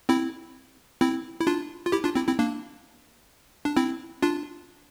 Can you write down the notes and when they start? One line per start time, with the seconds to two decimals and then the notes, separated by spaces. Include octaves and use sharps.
0.09 C4 E4
1.01 C4 E4
1.41 E4
1.47 D4 F4
1.86 F4
1.92 E4 G4
2.04 D4 F4
2.15 C4 E4
2.27 C4 E4
2.39 A#3 D4
3.65 D4
3.76 C4 E4
4.22 D4 F4